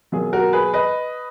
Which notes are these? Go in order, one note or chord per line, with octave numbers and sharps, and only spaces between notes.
B2 F#3 A#3 F4 G#4
F#4 A#4
G#4 B4
B4 D#5